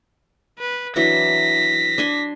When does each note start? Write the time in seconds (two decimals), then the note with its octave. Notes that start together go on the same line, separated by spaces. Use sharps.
0.59 B4
0.96 E3 F#3 D4 A#6 B6
1.98 D4 G#5 C6